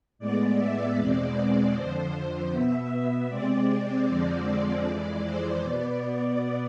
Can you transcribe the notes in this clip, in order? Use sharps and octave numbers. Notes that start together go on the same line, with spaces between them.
A2 G#3 B3 D5
E5
E2 B2 G#3 C4 D5
F2 D3 F3 C5
C5
B2 B3 E5
C3 G#3 C4 D5
F2 D3 F3 G#3 C4
D5
F2 E3 G#3 D5
C5
B2 B3 D5
D5